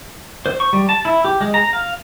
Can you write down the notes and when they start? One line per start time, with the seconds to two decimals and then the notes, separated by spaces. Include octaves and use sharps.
0.46 C5
0.60 C#6
0.73 G3
0.89 A5
1.05 E4
1.25 G4
1.41 G#3
1.54 A#5
1.73 F5